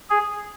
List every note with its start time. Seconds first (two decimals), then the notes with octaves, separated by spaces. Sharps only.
0.10 G#4